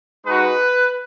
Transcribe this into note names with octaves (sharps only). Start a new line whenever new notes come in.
G#3 D#4 F#4 B4